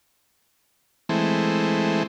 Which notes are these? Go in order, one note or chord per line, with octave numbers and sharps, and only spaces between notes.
E3 G#3 A3 C4